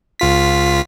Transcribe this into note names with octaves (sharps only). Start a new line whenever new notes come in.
C#2 F4 B6